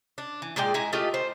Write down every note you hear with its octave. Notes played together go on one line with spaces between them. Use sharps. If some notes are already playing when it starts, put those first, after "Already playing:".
D4
E3
A#2 G#3 D5 G5
G#3 E4 G#5 A#5
A3 F4 G4 D#5
C5